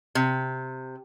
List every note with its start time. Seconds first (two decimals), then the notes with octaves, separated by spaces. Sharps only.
0.15 C3